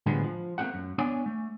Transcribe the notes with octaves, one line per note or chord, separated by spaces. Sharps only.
A2 D3 F3 G3 G#3 B3
F3
A3 A#3 C4 F4 G4 F#5
F#2
B3 D4 C#5 D5 F#5 G#5
A3